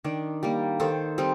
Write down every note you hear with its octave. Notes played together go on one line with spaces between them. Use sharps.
D#3 D4
G3 A#3
D#3 A4 C5
G3 C4 D#4